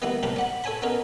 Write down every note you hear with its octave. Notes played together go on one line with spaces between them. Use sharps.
D#3 G3 A#3 B3 E4
B1 C3 A#3 D4 G4 B5
D5 F#5 B5
A4 C#5 G#5 A5 B5
B3 C#4 D#4 A#4 B4